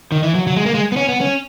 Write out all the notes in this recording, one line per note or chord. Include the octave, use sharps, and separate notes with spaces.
D#3
E3
F#3
F#3
G#3
A#3
G#3
B3
C#4
B3
C#4